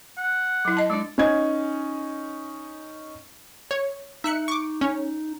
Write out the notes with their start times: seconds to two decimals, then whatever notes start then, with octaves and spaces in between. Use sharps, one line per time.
0.17 F#5
0.65 F#3 E4
0.77 D#5 A5
0.90 G#3 D4 D5
1.18 C#4 D#4 G#6
3.71 C#5
4.24 D#4 E5 F#6 C#7
4.48 C#6 D6
4.81 C#4